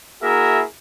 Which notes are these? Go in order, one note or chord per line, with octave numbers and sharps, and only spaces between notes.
A#3 E4 F#4 G#4 A#4 E5